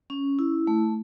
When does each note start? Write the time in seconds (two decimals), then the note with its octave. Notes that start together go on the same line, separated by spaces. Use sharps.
0.10 C#4
0.39 E4
0.67 A3